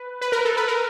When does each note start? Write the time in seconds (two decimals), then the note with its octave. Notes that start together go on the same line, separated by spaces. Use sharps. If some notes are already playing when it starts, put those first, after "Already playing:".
Already playing: B4
0.21 B4
0.32 A#4
0.45 A4
0.57 B4
0.68 A#4